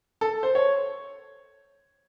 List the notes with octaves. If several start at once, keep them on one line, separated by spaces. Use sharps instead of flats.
A4
C5
C#5